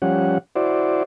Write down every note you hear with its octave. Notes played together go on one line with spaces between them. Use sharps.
F3 G3 C#4 F#5
E4 F#4 C5 D5